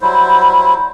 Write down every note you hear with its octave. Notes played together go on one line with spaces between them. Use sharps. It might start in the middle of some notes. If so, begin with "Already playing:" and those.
F#3 G3 E4 C5